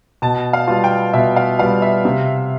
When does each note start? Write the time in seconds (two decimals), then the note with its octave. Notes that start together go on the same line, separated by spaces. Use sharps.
0.22 B2 A5
0.53 F5
0.68 G3 B3 F4
0.84 G5
1.13 B2 E5
1.36 F5
1.59 G3 B3 F4 F5
1.82 E5
2.05 C3